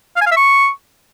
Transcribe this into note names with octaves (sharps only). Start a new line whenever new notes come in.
F5
G#5
F5
E5
C#6